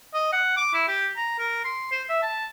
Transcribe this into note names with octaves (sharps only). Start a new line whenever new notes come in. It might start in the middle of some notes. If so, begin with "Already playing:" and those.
D#5
F#5
D6
E4
G4
A#5
A#4
C6
C5
E5
A5